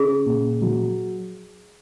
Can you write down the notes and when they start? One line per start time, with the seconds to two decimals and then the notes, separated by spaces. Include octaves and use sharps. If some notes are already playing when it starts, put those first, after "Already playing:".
Already playing: C#3 C#4 G#4
0.25 A#2
0.62 F#3